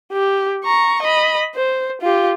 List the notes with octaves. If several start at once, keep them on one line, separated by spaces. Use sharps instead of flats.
G4
A#5 C#6
D#5 B5
C5
F4 G4